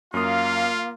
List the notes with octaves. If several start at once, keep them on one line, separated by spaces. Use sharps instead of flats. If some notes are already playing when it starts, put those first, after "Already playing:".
F#2 A#3 F4 F5 D#6